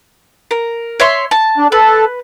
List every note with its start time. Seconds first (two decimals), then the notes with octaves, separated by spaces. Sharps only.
0.51 A#4
1.00 C#5 E5 C6
1.31 A5
1.58 D4
1.72 A4 B4